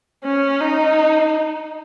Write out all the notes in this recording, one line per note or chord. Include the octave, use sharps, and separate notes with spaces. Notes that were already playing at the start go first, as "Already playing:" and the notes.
C#4
D#4